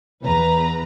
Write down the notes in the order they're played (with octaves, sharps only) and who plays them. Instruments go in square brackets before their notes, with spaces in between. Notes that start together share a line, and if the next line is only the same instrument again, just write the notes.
[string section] E2 B4 A#5